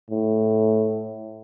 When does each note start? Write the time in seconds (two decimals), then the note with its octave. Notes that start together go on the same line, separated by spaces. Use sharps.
0.10 A2